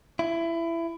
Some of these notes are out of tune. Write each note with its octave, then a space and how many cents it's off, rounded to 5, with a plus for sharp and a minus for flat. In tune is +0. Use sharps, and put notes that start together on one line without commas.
E4 +20